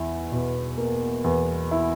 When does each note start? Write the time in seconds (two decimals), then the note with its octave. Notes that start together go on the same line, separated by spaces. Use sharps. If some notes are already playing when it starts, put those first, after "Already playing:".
Already playing: E2 E4
0.32 B2
0.77 A#3
1.24 E2
1.71 E4